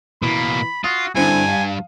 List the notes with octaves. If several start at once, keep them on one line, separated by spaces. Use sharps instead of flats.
B2 E3 A#3 B5
F4 F#4 D#6
G2 D3 C4 E4 G#5
F5